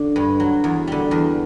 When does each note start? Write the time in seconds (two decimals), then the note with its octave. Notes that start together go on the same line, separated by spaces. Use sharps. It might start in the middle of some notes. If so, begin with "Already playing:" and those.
Already playing: D3 D4
0.16 G2
0.40 F#3
0.64 E2
0.87 D3 G3
1.11 E2